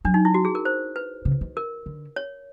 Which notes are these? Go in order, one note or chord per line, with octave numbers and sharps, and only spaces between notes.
F#3 D4
D#4
E4
F#4
G#4
A#4
C5
B4
C#3
D#3
A#4
D3
C#5